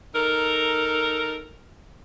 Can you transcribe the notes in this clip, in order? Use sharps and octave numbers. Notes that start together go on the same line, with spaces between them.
D#4 A4 A#4